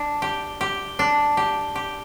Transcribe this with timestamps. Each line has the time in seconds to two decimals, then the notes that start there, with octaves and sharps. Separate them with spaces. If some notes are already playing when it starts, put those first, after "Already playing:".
Already playing: D4
0.22 G4
0.61 G4
0.99 D4
1.37 G4
1.75 G4